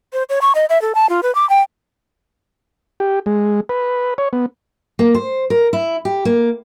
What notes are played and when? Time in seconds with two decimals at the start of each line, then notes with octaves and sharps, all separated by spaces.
0.13 C5
0.29 C#5
0.42 C#6
0.55 D#5
0.69 E5
0.82 A4
0.95 A5
1.09 F4
1.23 B4
1.35 D6
1.50 G5
3.00 G4
3.26 G#3
3.69 B4
4.18 C#5
4.33 B3
4.99 A#3
5.15 C5
5.50 A#4
5.73 E4
6.05 G4
6.25 A#3